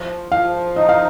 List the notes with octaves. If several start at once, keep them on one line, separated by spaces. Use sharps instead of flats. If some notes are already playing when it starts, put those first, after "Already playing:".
Already playing: F3
F3 F5
D#4 D#5
F5